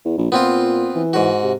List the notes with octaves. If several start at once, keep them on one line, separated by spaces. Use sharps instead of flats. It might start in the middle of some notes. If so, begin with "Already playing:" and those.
E2
A#1
A#2 B3 C4 F4
E3
G#2 F#4
C3